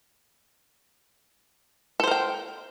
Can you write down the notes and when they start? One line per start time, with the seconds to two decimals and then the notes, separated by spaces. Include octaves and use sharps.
2.00 A4
2.04 C5
2.07 A#4
2.11 G5